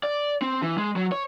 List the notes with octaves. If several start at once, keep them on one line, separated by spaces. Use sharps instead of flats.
D5
C4
E3
G#3
F#3
C#5